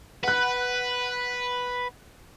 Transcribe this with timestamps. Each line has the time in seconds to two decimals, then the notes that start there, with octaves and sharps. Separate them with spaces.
0.24 B4 F#5 F#6